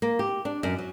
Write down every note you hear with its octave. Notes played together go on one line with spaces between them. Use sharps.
A#3
G4
D4
F#2
F#3